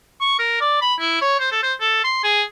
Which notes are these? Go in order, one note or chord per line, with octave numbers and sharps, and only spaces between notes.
C#6
A#4
D5
B5
E4
C#5
C5
A4
C5
A4
C6
G#4